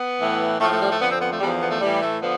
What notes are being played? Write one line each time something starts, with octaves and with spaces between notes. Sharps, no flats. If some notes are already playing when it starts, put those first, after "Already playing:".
Already playing: B3
A2 E3
A2 F3 A3
A3
G3
A3
F2 D3 F3 B3
C4
B3
A3
E2 D3 F3 G3
B3
A3
A2 E3 G3
A3
D3 F3 B3